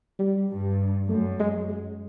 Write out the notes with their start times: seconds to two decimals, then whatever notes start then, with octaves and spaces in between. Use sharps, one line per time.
0.19 G3
0.50 G2
1.09 F#2 A3
1.40 G#3
1.69 G#3